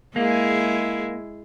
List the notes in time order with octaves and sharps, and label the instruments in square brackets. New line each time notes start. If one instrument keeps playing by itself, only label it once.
[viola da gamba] G#3 E4 G#4 [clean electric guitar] A#3